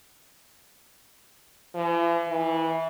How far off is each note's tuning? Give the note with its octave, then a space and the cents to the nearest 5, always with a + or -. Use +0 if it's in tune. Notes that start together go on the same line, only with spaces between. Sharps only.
E3 +45
E3 -20